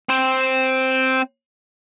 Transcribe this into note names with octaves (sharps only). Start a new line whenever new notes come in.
C4 C5